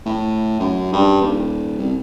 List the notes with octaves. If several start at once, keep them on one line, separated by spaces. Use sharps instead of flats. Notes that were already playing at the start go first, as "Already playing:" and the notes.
A2
F#2
G2
D#1
C2